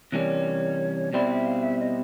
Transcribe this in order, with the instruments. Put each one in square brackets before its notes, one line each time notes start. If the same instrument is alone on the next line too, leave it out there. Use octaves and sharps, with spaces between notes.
[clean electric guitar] C3 E3 G3 A#3 C#4 [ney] C#5
[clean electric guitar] B2 G3 C4 E4 [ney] D5
[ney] E5
F5
E5
D#5